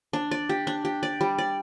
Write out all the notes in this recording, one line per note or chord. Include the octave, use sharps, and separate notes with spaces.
D4
D5
G4
D4
G4
D5
G3
D5